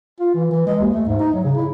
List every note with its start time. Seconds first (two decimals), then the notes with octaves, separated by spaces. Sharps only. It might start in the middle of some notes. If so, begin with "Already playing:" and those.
0.20 F4
0.35 E3
0.51 E3
0.67 G#3
0.81 D#2
0.94 A3
1.07 G#2
1.19 D#4
1.33 F#3
1.44 C#3
1.57 E4